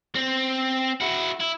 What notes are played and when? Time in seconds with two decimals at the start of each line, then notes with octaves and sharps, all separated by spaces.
0.15 C4
1.01 E4 F#4
1.40 E4